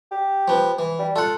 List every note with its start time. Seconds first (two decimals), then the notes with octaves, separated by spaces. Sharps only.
0.12 G4
0.48 F3 B3
0.79 E3
0.99 G3
1.16 F4 A4 F#5